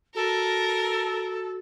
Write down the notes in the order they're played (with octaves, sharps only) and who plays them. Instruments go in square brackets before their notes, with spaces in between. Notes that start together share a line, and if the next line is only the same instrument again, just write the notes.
[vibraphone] F#4 [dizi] A4 [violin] A#4